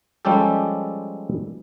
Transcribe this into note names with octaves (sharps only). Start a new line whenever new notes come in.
F3 G3 G#3 C#4 G4 A4